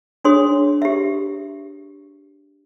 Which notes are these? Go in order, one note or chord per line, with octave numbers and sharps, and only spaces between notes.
D4 F#4 G#4 C#5 C6 D#6
G4 E5